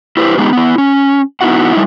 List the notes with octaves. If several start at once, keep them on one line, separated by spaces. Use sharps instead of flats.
E4 G4 B4 C5
F#3 G#3 B3 D#4 G4
B3 E4
C#4
B3 D#4 E4 F#4 F#5
G3 D#4 E4